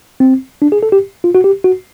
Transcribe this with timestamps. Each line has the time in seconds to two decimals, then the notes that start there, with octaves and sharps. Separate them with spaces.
0.20 C4
0.62 D4
0.72 G#4
0.83 A4
0.92 G4
1.24 F4
1.35 F#4
1.44 G4
1.64 F#4